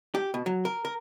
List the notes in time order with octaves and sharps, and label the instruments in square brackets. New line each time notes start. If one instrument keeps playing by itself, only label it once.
[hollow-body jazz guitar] G4
B2
F#3
A#4
A#4